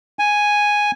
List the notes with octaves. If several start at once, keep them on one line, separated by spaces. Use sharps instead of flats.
G#5